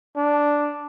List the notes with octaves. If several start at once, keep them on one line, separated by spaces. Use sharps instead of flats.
D4